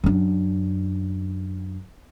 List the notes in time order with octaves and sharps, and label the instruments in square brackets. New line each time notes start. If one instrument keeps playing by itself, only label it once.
[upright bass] F#2 D4